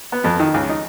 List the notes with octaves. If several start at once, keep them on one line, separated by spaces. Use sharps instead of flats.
B3
F2
D#3
C#2
D#4